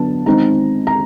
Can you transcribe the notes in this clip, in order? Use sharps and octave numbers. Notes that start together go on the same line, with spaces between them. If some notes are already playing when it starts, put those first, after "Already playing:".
Already playing: D3 F#3 B3 D4 A5
D#3 G#3 C4 D#4 A#5
A#5